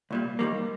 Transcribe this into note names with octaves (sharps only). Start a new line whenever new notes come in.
C2 A#2 G3
D#2 D#3 G3 A#3